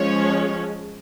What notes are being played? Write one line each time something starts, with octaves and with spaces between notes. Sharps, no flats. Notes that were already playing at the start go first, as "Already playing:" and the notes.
Already playing: F3 G#3 C#4 C#5